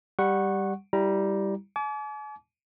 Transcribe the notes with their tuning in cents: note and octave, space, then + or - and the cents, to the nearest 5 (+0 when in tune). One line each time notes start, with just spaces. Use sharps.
G3 +0 F#5 +0 C#6 -15
G3 +0 E4 +0 A#5 +15
G#5 +45 D6 -35